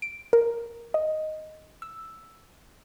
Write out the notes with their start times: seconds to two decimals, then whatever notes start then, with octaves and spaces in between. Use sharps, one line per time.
0.02 D7
0.33 A#4
0.94 D#5
1.82 E6